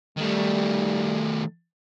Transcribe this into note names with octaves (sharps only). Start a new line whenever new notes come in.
D#3 G3 A3